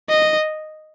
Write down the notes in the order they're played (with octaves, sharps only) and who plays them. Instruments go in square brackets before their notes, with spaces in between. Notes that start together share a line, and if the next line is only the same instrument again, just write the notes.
[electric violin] D#5